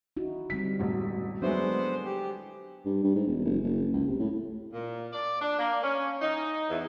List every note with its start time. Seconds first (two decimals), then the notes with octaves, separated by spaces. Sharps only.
0.17 D#4 E4 F#4
0.50 D3 G3 C4 B6
0.79 E1 A1 E4 F#4
1.42 F#3 G#3 B3 D4 A4 C5 E5
2.05 G4
2.85 G2
3.04 G2
3.16 G#2
3.27 E1
3.45 F#1
3.64 F#1
3.94 C#2
4.07 C3
4.20 A2
4.73 A#2
5.13 D5
5.41 D4
5.59 A#3
5.83 C#4
6.22 D#4
6.70 E2